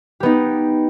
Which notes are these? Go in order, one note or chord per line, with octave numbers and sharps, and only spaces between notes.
B3 D#4 G4